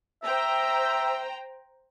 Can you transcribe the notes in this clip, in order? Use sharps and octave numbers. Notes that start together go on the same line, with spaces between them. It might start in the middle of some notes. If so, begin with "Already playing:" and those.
C5 E5 G5 A#5